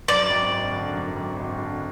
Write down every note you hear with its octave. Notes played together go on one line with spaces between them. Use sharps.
F#2 D5
G#1
G#1
D3
F#2
G#1
G#1
D3